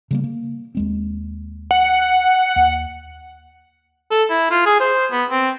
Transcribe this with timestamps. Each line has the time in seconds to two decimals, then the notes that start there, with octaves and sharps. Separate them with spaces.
0.11 C#3 G3 A#3
0.24 A#3
0.75 D#2 G#3 C4
1.71 F#5
2.56 D#2
4.11 A4
4.30 E4
4.51 F4
4.66 G#4
4.80 C5
5.12 B3
5.30 C4